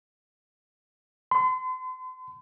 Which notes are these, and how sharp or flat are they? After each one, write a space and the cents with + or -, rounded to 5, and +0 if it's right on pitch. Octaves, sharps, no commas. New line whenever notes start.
C6 -40